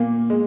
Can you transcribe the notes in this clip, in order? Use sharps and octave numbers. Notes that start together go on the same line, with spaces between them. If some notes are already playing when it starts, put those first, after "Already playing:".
Already playing: A#2 A#3
G#3